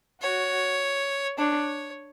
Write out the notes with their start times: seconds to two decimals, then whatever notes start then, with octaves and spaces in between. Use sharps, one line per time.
0.21 F#4 C#5
1.38 D4 C#5